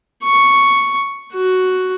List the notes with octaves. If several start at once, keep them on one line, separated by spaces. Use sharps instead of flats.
C#6
F#4